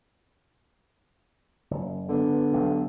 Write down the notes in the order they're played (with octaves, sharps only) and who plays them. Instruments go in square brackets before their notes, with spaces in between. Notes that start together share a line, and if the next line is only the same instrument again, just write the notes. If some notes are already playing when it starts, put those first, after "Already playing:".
[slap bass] F#1
[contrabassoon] D3 [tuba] B3
[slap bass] B1 G2